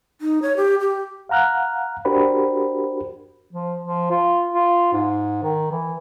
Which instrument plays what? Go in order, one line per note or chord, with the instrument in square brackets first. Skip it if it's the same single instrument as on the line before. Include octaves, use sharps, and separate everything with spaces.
[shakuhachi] D#4
C#5
G4
G4
[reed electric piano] F5 F#5 A#5 F6 F#6
D4 F#4 G4 A#4 C5 B5
[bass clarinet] F3
F3
F4
F4
G#2
D#3
E3